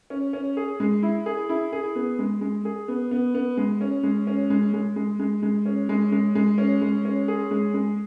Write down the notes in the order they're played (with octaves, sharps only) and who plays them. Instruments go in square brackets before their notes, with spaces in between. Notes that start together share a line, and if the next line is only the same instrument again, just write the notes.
[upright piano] C#4
C#4
G#4
G#3
E4
G#4
E4
G#4
B3
G#3
G#3
G#4
B3
B3
B3
G#3
C#4
G#3
C#4
G#3
G#3
G#3
G#3
G#3
C#4
G#3
G#3
G#3
C#4
G#3
C#4
G#4
G#3
G#3